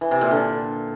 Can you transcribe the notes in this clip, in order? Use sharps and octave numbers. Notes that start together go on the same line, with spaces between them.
E3
C3
A#2
D3